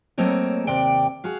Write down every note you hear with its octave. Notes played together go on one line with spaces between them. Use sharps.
F#3 A3 A#3 C4 C#5 D#5
D#2 C3 D5 G5
F#4 G#4 F5